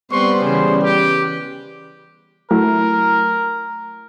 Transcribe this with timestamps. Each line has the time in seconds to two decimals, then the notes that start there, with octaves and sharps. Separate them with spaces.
0.11 G3 B3 C4 B4 C5 C6 C#6
0.41 C#3 E3 G#4 C5
0.83 G4 B4
2.51 F#3 A3 E4 A#4